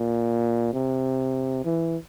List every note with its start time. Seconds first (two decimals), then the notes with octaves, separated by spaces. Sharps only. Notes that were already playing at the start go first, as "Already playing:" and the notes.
Already playing: A#2
0.73 C3
1.65 E3